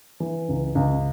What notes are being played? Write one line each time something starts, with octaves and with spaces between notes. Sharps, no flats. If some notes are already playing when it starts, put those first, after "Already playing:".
E3
C#2
C#2